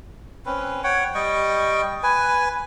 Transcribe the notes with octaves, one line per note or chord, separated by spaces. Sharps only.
C4 C#4 B4
C#5 F#5 G5
G3 D#5 G5 C#6
B4 G#5